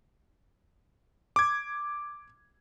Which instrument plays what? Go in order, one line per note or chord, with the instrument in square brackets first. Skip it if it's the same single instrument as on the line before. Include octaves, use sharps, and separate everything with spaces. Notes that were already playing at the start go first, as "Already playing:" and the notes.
[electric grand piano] D6 G#6